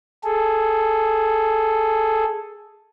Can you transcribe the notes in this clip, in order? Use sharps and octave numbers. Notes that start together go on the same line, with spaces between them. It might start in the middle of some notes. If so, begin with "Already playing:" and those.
G#4 A4